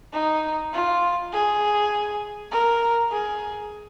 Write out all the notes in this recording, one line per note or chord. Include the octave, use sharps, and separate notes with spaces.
D#4
F4
G#4
A#4
G#4